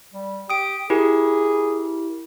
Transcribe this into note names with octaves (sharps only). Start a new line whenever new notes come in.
G3
G4 D#6 D7
E4 G4 G#4 A#4